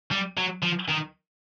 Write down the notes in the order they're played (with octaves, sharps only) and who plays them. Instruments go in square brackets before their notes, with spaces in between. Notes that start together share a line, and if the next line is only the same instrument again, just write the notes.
[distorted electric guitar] G3
F#3
F3
D#3